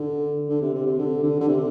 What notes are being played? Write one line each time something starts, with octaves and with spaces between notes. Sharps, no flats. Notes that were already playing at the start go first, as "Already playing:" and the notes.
Already playing: D3
D3
C3
C3
C3
D3
D3
D3
C3